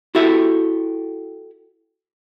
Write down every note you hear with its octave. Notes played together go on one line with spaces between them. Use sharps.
E4 F#4 G4 A4 E5